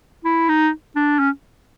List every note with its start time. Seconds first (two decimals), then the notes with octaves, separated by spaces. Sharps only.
0.25 E4
0.49 D#4
0.96 D4
1.19 C#4